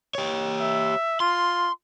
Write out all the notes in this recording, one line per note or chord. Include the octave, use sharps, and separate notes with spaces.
G4 C#5
E5
F4 C6